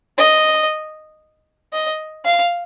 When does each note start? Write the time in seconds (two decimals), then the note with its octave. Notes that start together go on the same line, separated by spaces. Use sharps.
0.18 D#5
1.73 D#5
2.25 F5